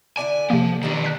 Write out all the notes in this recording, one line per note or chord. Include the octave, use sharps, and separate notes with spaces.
D3 E4 D5 G#5
C3 F3 A#3
B2 D#3 G3 D4
F#6 B6